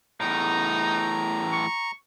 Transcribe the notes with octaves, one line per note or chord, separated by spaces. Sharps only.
E2 A2 D#4 A#5
C#6